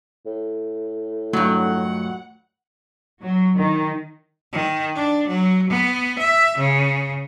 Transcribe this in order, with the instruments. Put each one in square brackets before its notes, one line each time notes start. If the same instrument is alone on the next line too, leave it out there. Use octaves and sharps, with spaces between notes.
[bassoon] A2
[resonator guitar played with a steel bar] G2 F#3 [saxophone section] A#2 D#3 F#5 [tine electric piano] A3
[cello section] F#3
D#3
[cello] D#3
D4
F#3
B3
E5
C#3